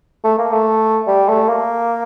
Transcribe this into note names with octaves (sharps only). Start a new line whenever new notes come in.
A3
A#3
A3
G3
A3
A#3